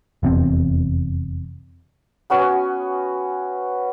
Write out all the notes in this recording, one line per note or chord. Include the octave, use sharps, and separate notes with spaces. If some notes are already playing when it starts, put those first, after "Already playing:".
F1 E2 C4
B3 C#4 F#4 G#5